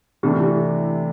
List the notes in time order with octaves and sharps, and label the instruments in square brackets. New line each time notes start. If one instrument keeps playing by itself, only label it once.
[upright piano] C3 E3 A3 D4 [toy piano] G4
[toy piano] G4
E4